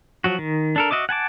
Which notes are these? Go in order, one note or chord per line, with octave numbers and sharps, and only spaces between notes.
F3 F#3 F#4
D#3
D4 A4 A#4
F#4 D#5 E5 D6
F#5 G#5 A5 D6